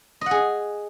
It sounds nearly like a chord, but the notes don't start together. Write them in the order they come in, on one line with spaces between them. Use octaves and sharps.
D#5 F#5 G#4